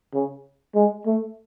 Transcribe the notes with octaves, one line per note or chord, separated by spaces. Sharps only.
C#3
G#3
A3